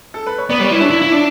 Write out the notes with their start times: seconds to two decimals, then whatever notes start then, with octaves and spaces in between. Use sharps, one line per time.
0.14 A4
0.27 B4
0.38 C#5
0.50 B3 B4 D5
0.60 G3 C#5
0.65 B4 D5
0.71 E4
0.80 D4 C#5 E5
0.90 E4
1.02 E4
1.12 D4